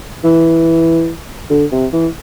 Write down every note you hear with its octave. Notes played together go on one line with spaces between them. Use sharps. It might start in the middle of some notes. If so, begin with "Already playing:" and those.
E3
D3
C3
E3